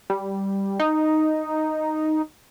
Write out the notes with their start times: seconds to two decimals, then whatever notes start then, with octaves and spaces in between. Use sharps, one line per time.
0.10 G3
0.80 D#4